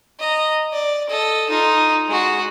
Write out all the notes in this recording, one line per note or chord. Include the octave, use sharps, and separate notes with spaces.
D#5 A#5
D5
A4 D#5
D#4 F4
G#3 F#4